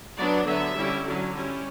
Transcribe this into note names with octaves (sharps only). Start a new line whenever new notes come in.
F#3 B3 D4 D5
D3 F#3 B3 E5
D3 G3 C#4 E4
D3 F#3 C#4
G3 C#4 E4